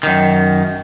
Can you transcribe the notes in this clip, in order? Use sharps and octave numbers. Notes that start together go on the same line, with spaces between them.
F#2 D#3